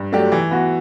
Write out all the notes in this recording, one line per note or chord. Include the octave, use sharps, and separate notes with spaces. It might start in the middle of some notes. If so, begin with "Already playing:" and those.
Already playing: G2
F#3 A3 D4 G4
E3
B3 F#4